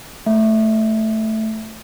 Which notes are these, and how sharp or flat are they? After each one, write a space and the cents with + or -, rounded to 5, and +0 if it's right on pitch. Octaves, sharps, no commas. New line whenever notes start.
A3 +0 E5 +0